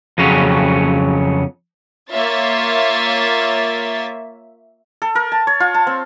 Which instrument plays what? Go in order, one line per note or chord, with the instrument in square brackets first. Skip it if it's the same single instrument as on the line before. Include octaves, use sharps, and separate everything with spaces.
[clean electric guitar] F2 C#3 F#3 C#4
[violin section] A#3 F4 C#5 E5 A6
[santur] A4
A#4
A5
C#5
F4
A5
C4